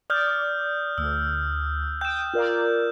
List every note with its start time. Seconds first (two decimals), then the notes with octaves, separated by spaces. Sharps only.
0.10 D5 D#6 F6 G6
0.98 D2 E6
2.01 G5 D#6 G6 E7
2.33 F4 A#4 D5